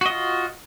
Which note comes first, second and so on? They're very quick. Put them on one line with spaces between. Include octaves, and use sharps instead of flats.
F#4 D#5 F4